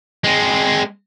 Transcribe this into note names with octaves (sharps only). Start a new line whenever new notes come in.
G#3 C4